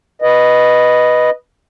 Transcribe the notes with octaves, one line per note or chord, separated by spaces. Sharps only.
B4 D#5